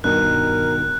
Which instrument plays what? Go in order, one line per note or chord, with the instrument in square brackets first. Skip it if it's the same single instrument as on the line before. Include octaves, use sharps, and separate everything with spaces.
[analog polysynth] G2 [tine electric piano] B2 D#3 [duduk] A#4 [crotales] F#6